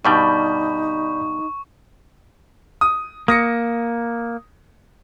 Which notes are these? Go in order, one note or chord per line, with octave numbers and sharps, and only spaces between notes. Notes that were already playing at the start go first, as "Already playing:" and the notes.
G2 B2 G3 D#4 D5 B5 C#6 G6
D#6
A#3 D#6 A#6 C#7